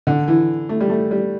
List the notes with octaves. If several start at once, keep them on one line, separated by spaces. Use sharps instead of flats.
D3
E3
A3
G3
A3
G3